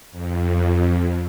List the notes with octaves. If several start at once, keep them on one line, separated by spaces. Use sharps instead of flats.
F2